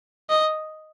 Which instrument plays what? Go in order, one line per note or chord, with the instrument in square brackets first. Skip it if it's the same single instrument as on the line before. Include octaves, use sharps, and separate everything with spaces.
[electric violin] D#5